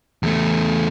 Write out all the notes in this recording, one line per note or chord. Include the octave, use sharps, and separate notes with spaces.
E2 A3